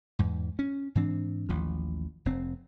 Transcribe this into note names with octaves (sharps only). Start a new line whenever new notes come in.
E2 G#2
C#4
G#2 E3 C4 D4
A1 D#2 F3
F1 C4